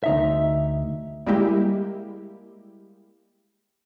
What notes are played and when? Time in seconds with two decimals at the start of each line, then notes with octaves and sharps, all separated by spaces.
0.04 D2 D#4 E5
1.26 G3 G#3 A#3 E4 G4